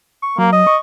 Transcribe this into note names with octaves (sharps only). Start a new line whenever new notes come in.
C#6
F#3 A#3
D#5
C#6